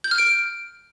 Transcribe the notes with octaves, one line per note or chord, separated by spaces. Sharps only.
G6
F6
D7